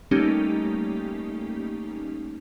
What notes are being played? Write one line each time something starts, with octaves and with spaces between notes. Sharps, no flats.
G3 A3 A#3 C#4 D#4 G4